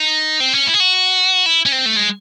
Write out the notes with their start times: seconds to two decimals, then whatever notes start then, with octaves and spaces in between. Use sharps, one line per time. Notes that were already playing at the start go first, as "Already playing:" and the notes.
Already playing: D#4
0.40 C4
0.53 C#4
0.67 E4
0.74 G#4
0.80 F#4
1.46 E4
1.66 C#4
1.72 C4
1.86 A3
1.97 G#3